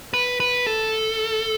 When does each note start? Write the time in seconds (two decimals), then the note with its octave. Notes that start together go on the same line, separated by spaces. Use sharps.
0.14 B4
0.40 B4
0.67 A4